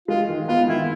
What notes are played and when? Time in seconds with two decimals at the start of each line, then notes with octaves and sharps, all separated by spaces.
0.08 G#3 F4
0.29 D#3
0.48 B3 F4
0.68 D#3 E4